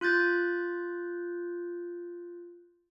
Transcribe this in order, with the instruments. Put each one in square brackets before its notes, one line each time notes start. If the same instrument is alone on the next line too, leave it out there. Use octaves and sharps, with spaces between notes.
[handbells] F4 F#6 G6 A6